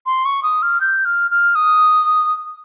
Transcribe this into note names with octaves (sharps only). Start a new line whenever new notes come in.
C6
C#6
D#6
F6
G6
F6
F6
D#6